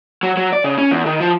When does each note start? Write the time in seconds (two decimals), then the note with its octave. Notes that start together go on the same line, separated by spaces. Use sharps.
0.23 F#3
0.37 F#3
0.52 D5
0.64 C#3
0.78 C#4
0.91 E2
1.06 D#3
1.20 F3